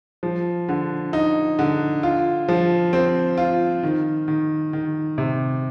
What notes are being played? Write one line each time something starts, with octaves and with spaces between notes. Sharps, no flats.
F3
D3
D#4
D3
F4
F3
C4
F4
D#3
D#3
D#3
C3